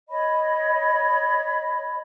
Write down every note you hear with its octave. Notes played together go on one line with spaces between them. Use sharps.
C#5 D#5 B5